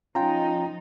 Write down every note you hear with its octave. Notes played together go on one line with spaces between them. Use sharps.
F3 C#4 D#4 F4 G5 A#5